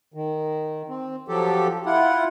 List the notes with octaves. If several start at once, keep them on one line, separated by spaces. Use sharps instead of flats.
D#3
C4
F3 F#3 G4 A4
E4 F4 F#5